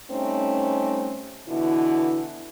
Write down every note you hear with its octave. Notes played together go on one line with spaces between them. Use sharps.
G3 A3 C4 C#4 D#4
B2 D3 E3 E4